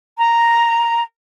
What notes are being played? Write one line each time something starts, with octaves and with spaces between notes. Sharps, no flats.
A#5